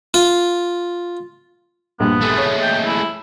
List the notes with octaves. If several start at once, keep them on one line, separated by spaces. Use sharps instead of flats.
F4
A#1 G2 B3
G#3 A3
C#5
G5
E4